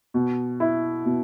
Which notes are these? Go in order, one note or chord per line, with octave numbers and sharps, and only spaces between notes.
B2
E4
B2